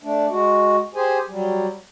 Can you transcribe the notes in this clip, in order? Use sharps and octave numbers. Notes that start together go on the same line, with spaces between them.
A3 D4
G#3 F#4
G4 G#4 C5 G#5
F#3 G3